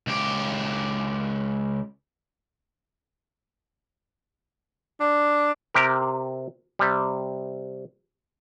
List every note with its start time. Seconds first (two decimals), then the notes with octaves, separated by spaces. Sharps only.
0.07 C#2 G4
5.01 D4
5.74 C3 G4 A#4
6.79 C3 G3